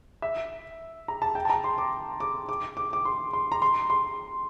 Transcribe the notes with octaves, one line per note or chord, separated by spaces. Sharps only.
E5
A#5
A5
G5
A5
A#5
C6
D6
D6
D6
D6
D6
C6
C6
A#5
C6
C6